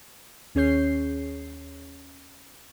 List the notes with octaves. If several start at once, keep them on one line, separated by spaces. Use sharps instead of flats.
D#2 C#4 G#4 C#5 G6 C7